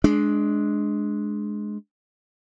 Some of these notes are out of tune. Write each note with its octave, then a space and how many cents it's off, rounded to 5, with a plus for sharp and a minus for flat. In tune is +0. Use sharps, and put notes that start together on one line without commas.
G#3 +15 D4 +0